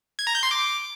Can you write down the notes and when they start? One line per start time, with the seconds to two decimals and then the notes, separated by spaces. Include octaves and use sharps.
0.19 G#6
0.27 A#5
0.35 G6
0.43 C6
0.51 D6